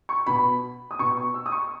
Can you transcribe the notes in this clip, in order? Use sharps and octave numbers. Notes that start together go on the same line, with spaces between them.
C#6
B2 B5
D#6
B2 C#6
C#6
E6
D#6
C#6